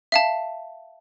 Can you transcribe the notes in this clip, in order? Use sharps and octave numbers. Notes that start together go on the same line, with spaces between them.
E5 F5 A5